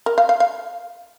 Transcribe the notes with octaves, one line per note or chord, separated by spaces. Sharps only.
A#4
F5
F5
F5